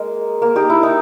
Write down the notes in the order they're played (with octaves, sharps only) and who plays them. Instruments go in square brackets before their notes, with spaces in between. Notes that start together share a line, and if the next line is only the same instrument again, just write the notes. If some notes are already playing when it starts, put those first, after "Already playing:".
Already playing: [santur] G#3 A#3
A#3
D#4 G4
E4
D#4